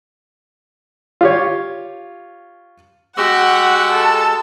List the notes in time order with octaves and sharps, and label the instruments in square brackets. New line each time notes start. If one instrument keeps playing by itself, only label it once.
[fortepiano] F4 G4 C#5
[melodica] G#3 E6 [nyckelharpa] F#4 G4 [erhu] F#5
[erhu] A4